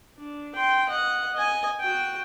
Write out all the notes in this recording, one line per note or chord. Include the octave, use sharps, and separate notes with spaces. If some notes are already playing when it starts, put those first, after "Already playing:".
D4
G5 C6
D#5 F#5
D#5 G#5
F#4 G5